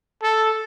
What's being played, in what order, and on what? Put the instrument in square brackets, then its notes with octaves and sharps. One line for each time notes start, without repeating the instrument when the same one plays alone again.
[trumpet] A4